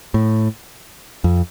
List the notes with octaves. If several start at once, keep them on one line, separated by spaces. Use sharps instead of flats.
A2
F2